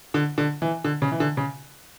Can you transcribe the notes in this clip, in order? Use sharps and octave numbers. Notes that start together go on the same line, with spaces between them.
D3
D3
E3
D3
C#3
E3
D3
C#3